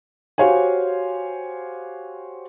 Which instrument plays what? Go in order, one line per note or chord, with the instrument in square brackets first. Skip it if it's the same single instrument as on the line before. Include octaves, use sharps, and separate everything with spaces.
[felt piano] F#4 G4 C5 C#5 F5 G#5